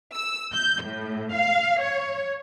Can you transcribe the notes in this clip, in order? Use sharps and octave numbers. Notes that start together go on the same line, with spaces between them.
E6
G6
A2
F5
C#5